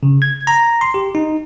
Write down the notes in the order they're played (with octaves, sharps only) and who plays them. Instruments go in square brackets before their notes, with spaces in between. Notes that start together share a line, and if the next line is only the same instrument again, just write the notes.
[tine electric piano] C#3
G#6
A#5
C6
G4
D#4